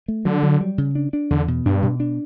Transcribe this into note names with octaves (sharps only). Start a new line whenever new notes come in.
A3
D3 F#3
F#3
G3
C#3
D4
D4
E2 D3
B2
G2 D4
B2
D4